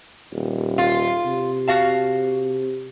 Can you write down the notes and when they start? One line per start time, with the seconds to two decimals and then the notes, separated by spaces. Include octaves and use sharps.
0.34 D#1
0.78 F4
1.26 C3
1.68 F#4 F5 A5